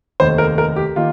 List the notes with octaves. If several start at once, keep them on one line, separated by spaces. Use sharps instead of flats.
F1 D#2 D#3 C5
A#4
A#4
G4
D#3 A#3 F4